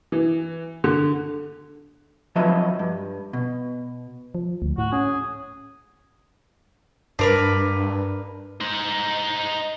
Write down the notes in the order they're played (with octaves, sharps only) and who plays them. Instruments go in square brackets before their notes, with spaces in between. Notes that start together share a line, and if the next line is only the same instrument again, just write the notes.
[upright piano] E3
D3
[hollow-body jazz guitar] F3 F#3 B4 D#5 E5
G2
B2
[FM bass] F3
D2
[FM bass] A2 [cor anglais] F#4
[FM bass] C#4 [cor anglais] G#4
[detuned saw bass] G2 [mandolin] D4 A#4 B4
[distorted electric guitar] D#4 C5